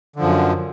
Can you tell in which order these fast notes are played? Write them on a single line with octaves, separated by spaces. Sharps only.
D3 F3 F#2